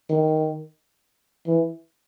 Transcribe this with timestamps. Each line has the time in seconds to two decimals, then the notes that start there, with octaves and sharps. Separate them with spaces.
0.10 D#3
1.47 E3